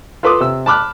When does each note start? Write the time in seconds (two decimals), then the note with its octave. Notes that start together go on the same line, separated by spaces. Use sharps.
0.23 F4 A4 B4 C6 D6 D#6
0.40 C3 E6
0.66 A5 B5 D6 F6 F#6